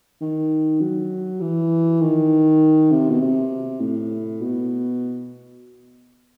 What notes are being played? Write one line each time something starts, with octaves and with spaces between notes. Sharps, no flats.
D#3
F#3
E3
D#3
C3
B2
C3
A2
B2